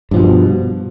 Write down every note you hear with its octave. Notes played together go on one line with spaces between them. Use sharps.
G2 B2 F3